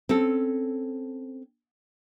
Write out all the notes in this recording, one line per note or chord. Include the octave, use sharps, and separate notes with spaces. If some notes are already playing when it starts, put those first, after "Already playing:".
C4 C#4 A4